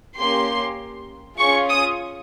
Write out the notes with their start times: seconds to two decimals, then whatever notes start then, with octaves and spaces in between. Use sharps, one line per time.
0.18 A#3 C#4 G4 C6
1.39 C#4 F4 G#4 C#6
1.69 D#6